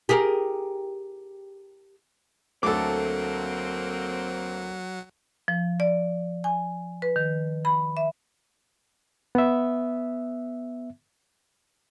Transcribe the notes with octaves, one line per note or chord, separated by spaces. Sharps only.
G4 G#4 A#4
D2 F#3 A3 A#3 C4 A4 F#5 D6
F3
D5
G#5
B4
D#3
B5
E5
B3 E5